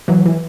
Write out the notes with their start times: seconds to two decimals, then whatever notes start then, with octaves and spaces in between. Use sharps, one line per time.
0.08 E3 F#3
0.26 E3